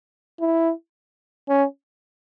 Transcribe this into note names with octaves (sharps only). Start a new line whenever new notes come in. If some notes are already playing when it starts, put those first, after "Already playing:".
E4
C#4